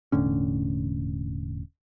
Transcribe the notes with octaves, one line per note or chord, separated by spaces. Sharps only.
E1 A2 D3 C#4